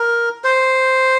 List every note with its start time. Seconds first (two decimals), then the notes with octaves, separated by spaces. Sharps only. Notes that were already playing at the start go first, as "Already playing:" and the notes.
Already playing: A#4
0.44 C5